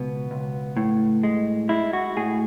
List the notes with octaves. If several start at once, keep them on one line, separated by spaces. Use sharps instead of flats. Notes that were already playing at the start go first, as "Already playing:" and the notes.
Already playing: C#2 B2 B3
C#2
A2
G#3
G#3 E4
F#4
A2 G#4